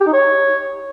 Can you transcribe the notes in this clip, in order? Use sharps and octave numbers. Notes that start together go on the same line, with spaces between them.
G4
D#4
C#5